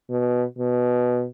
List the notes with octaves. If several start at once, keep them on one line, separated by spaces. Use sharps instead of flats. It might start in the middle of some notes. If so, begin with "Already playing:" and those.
B2
B2